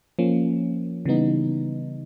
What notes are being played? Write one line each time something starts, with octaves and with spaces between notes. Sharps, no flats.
F3 A#3 C#4
C#3 E3 G3 B3 D#4